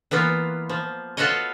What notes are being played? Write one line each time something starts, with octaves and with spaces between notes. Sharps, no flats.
E3 A#3 B3 F4
F3
F4 F#4 A4 B4 C#5 D#5